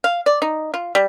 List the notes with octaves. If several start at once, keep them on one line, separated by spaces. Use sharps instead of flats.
F5
D5
D#4
F4
G3